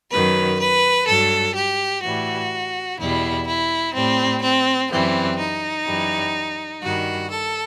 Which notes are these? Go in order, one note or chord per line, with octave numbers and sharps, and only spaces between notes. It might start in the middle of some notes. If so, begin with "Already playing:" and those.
F#2 D#3 F#3 B4
B4
G2 F#3 A4
G4
A2 E3 G3 F#4
E2 B2 G3 E4
E4
A2 G3 C4
C4
F#2 E3 G3 C4
D#4
F#2 E3 G3
G2 D#3 G3 F#4
A4